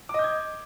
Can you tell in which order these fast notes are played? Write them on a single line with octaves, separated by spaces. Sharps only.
D6 D#5 G6 G#6